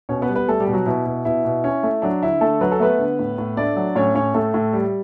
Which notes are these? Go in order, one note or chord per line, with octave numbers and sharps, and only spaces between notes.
B2 C#4 C#5
B3 B4
G3
B3 B4
G3 A3 A4
G3 G4
B2
F#3 F#4
B2 E4
B2
B2 E4
B2
C#4
A3
F#3 D4
D3 E4
D3 A3 A4
F#3 B4
A4
A3 B3 B4
D3
A2
A2
A3 D4 D5
F#3
A2 C#4 C#5
A2 C#4 C#5
A2 A3 A4
A2
G3